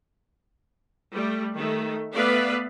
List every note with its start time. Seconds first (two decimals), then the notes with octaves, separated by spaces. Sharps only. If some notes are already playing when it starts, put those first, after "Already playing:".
1.13 G3 A3
1.55 D#3 A3
2.13 A3 B3 B4 D5 E5 F5